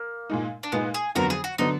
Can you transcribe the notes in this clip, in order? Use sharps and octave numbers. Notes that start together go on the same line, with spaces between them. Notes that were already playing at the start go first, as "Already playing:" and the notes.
Already playing: A#3
A#2 G#3 D#4
D4
A#2 G#3 B3 D#4
G#4
F2 D3 F#3 B3 F#4 A#4
G#4
F#4
D3 F#3 B3 D#4